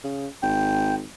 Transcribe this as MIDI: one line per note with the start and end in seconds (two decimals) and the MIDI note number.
0.04 0.27 49
0.43 1.05 32
0.43 0.95 79